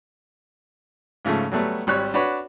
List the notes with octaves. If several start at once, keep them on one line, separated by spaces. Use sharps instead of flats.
G#2 C#3 F3 A3
F#3 G3 A3 B3
G#1 G3 C#5 F#6
D4 F#4 B4 C#5